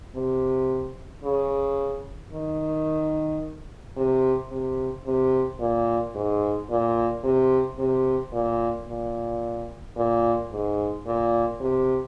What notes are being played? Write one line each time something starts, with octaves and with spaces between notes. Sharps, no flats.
C3
C#3
D#3
C3
C3
C3
A#2
G#2
A#2
C3
C3
A#2
A#2
A#2
G#2
A#2
C3